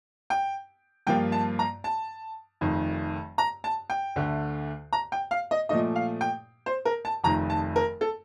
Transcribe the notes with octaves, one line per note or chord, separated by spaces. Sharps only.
G5
G2 F3 A#3 F4 G5
A5
A#5
A5
F1 F2 D#3
A#5
A5
G5
D2 D3 A3
A#5
G5
F5
D#5
A#2 F3 A3 D#5
F5
G5
C5
A#4
A5
F1 F2 D#3 A#5
A5
A#4
A4